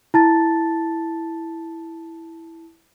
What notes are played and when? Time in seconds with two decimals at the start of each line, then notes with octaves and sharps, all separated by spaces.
0.14 E4 A5 A6